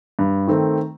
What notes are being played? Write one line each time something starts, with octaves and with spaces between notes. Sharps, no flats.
G2
D#3 A3 C4